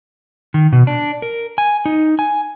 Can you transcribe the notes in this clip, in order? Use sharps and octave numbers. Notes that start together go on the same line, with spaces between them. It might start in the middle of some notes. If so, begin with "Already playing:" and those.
D#3
B2
D4
A#4
G#5
D#4
G#5